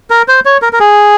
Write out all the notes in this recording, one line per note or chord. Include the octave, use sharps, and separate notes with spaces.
A#4
C5
C#5
A#4
A#4
G#4